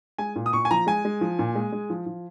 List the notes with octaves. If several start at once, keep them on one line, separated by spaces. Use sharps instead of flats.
G#3 G#5
A#2
D#6
A#2 C#6
G#5
F3 A#5
G#3 G#5
G#3
F3
A#2
G#3
G#3
F3
F3